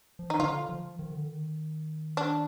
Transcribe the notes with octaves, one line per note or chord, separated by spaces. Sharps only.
F3
D#3 D#4
D3 F4
F3
D#3
D3
D#3
D4